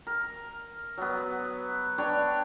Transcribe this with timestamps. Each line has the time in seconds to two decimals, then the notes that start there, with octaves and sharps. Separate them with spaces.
0.07 A#4
0.98 F#3 B3
1.98 D4 B4 C#5 G5